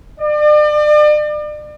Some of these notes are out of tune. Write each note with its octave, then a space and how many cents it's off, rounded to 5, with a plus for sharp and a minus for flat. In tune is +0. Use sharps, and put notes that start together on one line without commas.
D5 +40